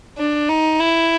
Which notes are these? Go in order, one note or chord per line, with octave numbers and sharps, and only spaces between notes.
D4
D#4
E4